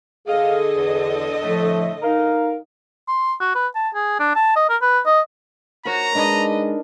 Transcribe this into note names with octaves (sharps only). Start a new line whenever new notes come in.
D3 G#4 A4 D#5 F5
E2
A2 F3 A3
D#4 A#4 F5
C6
F#4
B4
A5
G#4
D4
A5
D#5
A#4
B4
D#5
F#4 A#4 C#5 A#5
G#3 D4 D#4 B4 D#5